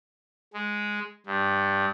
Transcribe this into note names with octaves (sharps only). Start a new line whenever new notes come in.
G#3
G2